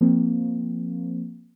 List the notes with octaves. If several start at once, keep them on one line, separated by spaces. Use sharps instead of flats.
F3 A#3 C4